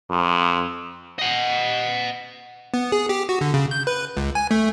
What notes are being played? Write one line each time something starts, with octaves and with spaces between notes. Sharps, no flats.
F2
D#5 F#5
B3
G#4
G4
F#4
D3
C#3
G6
B4
C#2
G#5
A3